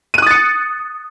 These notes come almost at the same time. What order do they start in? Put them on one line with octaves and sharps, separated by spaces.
D#7 F#6 D#6 A6 C#7